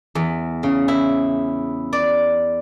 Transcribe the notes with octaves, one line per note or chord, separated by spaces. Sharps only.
E2
C#3
E4
D5